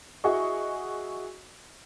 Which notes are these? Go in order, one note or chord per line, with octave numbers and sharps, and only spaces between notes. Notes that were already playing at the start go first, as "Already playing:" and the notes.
E4 F#4 G#4 D#5 C#6